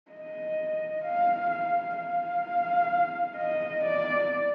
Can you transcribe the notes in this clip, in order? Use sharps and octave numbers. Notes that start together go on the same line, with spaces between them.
D#5
F5
F5
F5
D#5
D5